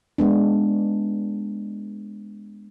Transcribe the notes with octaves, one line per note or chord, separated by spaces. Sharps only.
G#3 B3 D4